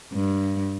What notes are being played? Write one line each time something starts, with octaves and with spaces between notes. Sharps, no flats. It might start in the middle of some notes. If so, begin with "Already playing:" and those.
G2